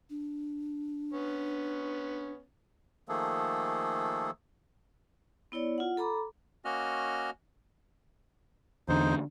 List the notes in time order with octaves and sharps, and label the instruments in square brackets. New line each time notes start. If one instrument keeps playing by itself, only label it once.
[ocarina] D4
[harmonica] B3 C#4
[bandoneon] D#3 F3 A3 A#3 G#4 A4
[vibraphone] B3 E4 C#5 D5
F4 F#5
A4 A#5 B5 D6
[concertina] A#3 C#4 F#4 D#5 F6
[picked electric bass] E2 D3 [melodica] D#4 C5